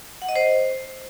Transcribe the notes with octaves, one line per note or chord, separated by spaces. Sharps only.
F#5
D#5
C5